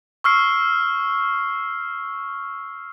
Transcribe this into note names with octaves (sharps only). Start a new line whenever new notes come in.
C#6 E6 F6 C7